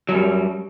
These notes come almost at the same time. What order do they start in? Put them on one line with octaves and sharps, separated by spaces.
F#3 F#2 G3